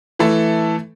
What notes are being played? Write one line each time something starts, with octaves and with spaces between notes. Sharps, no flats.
E3 A3 A4